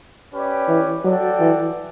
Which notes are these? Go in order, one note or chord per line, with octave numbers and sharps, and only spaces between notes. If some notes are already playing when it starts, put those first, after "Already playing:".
C#4 G4 B4 D5
E3
F#3 F#4 A4 D5 G5
E3